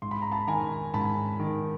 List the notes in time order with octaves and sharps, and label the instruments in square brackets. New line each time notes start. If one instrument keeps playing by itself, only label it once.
[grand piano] G#2 C6
B5
A#5
A5 B5
D#3 G#5 A#5
G#2 A5 B5
D#3